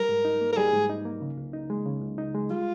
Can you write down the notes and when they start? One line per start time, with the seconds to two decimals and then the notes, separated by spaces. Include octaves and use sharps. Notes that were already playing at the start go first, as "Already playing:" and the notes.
Already playing: G3 A#4
0.09 G#2
0.25 D#4
0.41 A#3
0.52 A#4
0.57 G3 G#4
0.74 G#2
0.90 D#4
1.05 A#3
1.21 C#3
1.38 C#2
1.53 D#4
1.70 G#3
1.86 C#3
2.02 C#2
2.18 D#4
2.35 G#3
2.50 G3 F4